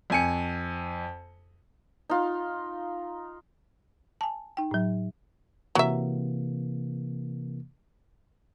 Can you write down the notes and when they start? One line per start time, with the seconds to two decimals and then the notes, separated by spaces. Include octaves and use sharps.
0.10 F2 G#5 C#7
2.09 D#4 F4
4.21 G#5 A5
4.57 D#4 G5
4.71 A2 F#3
5.75 C3 E3 F#3 A#3 E5